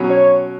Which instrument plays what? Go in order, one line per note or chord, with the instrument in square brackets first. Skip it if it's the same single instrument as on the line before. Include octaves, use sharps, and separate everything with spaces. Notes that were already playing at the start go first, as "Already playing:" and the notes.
Already playing: [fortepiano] B2 F#3 C#4
[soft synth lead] C#5